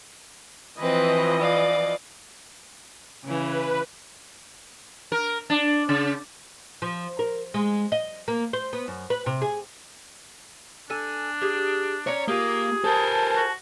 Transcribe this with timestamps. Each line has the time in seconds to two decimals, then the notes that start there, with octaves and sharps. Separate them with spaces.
0.79 E3 F3 C4 B4 D#5
1.40 D5 F5
3.24 C#3 E3 B4
5.12 A#4
5.50 D4
5.89 C#3
6.82 F3
7.19 A#4
7.54 G#3
7.92 D#5
8.28 A#3
8.53 C5
8.73 B3
8.88 F#2
9.10 B4
9.26 C3
9.42 G#4
10.90 D4 A4 G#5
11.41 G4 G#4
12.07 C#4 C#5 D5 A#5
12.28 A#3 F4 G4 G#4
12.84 A4 A#4 C5 G#5 A5
13.36 F#4